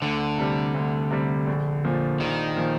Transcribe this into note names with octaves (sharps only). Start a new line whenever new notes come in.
D2 D3
C3 G3
D2
C3 G3
A#1
A#2 F3
A#1 D#3
A#2 F3